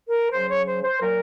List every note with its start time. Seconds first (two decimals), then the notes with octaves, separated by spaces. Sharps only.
0.08 A#4
0.31 C#3 F#3 C5
0.49 C#5
0.66 C5
0.84 C5
1.02 A#2 F#3 A#4